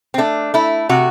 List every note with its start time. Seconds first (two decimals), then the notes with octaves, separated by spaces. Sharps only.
0.14 C4
0.18 A3 D4
0.54 A3 E4
0.89 C3 F#4